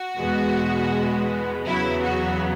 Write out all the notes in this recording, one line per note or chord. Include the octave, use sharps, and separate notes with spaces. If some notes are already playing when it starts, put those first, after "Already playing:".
Already playing: F#4
E2 B2 G#3 B3
E2 C#3 F#3 B3 E4
F#4